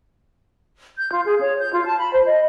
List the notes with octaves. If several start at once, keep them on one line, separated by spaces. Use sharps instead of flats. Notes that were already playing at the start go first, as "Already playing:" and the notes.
G6
F4
G#4
C#5
G6
F4
A5
B5
C5
D#5